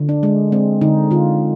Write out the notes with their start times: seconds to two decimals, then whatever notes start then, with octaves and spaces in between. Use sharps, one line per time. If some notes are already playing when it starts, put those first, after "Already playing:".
Already playing: D3
0.09 D4
0.23 G#3
0.52 G#3 C4
0.81 D3 D#4
1.11 D3 F4